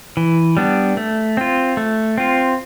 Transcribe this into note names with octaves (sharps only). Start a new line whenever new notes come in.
E3
G3 B3 D4
A3
C4 F4
A3
C4 F4